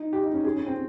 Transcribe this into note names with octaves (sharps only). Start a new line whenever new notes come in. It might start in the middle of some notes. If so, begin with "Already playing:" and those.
Already playing: D#4
G4
D#4
C#4
G#4
C#4
C4